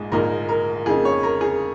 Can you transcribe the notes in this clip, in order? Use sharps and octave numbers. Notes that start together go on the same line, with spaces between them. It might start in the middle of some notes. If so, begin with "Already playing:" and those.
Already playing: A#1 G#2 G#3
A#1 G#2 G#3 D#4 A#4
A#4
F2 C#3 A#3 D#4 G#4
C#5
A#4
G#4